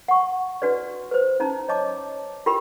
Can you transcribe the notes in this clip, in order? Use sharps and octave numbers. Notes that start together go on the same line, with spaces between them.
F#5 C#6
D4 F#4 B4 D5
B4 C5
C#4 D#4 A5 A#5
C#5 D#5 A5 D6
F4 G4 A#4 G5 B5